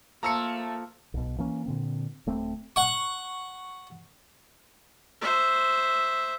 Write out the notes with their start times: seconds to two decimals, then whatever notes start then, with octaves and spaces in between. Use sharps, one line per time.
0.23 F3 A3 A#3 A#5 E6 C#7
1.14 B1 B2
1.38 E3 A#3 C#4
1.66 A#2 D3 C4
2.27 D1 A3 C4
2.76 F#5 C#6
5.21 C5 E5